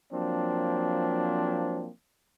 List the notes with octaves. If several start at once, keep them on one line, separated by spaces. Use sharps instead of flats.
F3 F#3 A#3 C4 D4